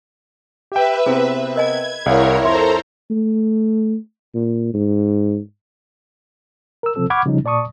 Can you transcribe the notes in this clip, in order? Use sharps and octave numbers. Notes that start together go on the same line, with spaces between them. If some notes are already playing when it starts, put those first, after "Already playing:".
G4 B4 E5 G5
C3 B3 C4 E4 G#4
A#4 D#5 G#5 G#6
C2 E4 G#4 A#4 C#5 D5 F5
F2 A4 C5 E5 A#5 C6
A3
A#2
G#2
A#4 E6
C3 F3 C4 A4 E6
F#5 B5 C#6 D6 F6 G#6
C#3 F3 G3 C#4 D#4
A#2 D5 A5 C#6 D#6